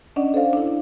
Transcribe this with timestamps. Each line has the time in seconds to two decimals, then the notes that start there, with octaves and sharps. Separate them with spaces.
0.16 C#4 D4 D5 D#5 F#5
0.34 A4 C5 F5
0.53 D4 E4